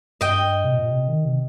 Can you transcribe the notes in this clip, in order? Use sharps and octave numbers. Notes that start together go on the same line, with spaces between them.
G2 D#5 G5
C3
A#2
C3
D#3
C3